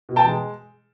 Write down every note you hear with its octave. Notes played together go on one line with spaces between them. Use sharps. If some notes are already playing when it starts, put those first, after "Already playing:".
B2
G5 A5
G#3